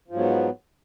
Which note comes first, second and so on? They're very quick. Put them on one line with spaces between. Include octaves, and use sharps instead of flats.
F3 G#2 F#3 B3